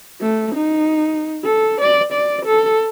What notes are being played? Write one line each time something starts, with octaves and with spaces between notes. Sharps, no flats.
A3
D#4
A4
D5
D5
A4